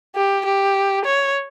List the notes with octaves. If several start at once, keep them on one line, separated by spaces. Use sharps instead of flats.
G4
G4
C#5